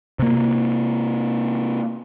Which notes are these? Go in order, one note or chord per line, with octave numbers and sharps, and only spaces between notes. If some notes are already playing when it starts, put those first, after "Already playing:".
C3 A#3